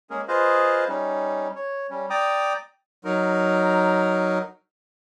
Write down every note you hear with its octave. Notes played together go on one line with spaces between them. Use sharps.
G#3 A#3 C#4 G#4 A#4
F4 G#4 B4 C5 D#5 F5
G3 C#4 D#4
C#5
G3 C#4
D5 G5 A#5 D6 D#6
F#3 D#4 A#4